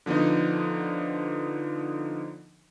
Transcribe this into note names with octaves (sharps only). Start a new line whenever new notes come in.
D3 F3 B3 D4 D#4